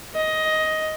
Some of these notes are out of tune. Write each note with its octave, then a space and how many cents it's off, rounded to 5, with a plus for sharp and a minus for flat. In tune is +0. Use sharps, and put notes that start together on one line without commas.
D#5 +10